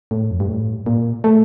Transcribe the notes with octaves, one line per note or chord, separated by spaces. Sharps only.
A2
F2
G2
A2
A#2
A3